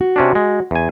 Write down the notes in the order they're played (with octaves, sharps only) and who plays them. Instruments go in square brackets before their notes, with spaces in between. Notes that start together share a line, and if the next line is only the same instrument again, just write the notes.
[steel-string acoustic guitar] F#4
[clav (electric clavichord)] C3 C#4 D4
G#3
E2 G#5